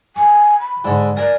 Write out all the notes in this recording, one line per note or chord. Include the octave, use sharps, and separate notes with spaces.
G#5 C#6
B5
G#2 D3
A#4 D5 G#5